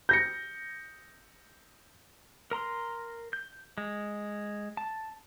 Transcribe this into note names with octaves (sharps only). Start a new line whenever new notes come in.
G6 A#6 C#7
A#4 A#5 C6
G6
G#3
A5